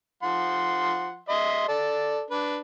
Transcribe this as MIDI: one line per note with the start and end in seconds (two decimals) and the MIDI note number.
0.23 1.19 53
0.23 1.19 78
0.23 1.19 84
1.29 1.67 75
1.29 1.67 76
1.29 1.67 84
1.68 2.23 69
1.68 2.23 74
1.68 2.23 81
2.30 2.58 62
2.30 2.58 71